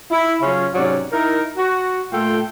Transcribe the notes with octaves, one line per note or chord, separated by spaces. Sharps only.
E4
C#3 F#3 C#4 F4
G#2 C3 F#3 C#4 D5
D#4 E4 A#4
F#4
A#2 A3 F4 A4 G5